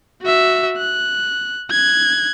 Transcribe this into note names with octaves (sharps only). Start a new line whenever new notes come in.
F#4 E5
F#6
F#6 G#6